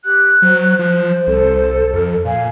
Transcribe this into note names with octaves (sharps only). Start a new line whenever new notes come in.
G4 F#6
F#3 C5
F3
C2 A4
F2 A#4
A#2 F5 G#5